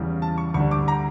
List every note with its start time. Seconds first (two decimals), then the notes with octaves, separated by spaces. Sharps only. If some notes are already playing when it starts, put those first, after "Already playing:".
Already playing: E2 C#3 G3
0.22 A5
0.38 C#6
0.54 D2 D3 G3 D4 C#6
0.71 D6
0.88 A#5